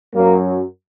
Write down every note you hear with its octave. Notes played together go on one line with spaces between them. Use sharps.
F#2 F#3 A#3